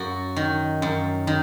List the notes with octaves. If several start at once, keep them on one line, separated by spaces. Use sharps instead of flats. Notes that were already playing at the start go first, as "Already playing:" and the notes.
Already playing: F#2 F#4
D#3
F#2
D#3